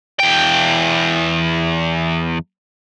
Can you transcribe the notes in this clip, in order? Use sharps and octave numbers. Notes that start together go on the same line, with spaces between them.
E2 G5